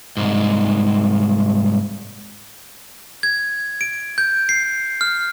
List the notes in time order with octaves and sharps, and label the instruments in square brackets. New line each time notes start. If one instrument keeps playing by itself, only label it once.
[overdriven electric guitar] C2 G#2
[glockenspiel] G#6
D7
G6
C7
F6